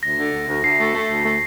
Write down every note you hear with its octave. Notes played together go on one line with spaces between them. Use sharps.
D2 A#6
D3
D2
D2
D2 C7
A3
A3
D2
A3